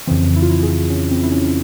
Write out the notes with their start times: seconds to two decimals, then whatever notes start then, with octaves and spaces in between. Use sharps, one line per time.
0.07 F2 C#3 E3 C4
0.36 E4
0.42 F4
0.50 E4
0.63 G#4
0.90 C#4
1.11 C4
1.23 E4
1.31 C#4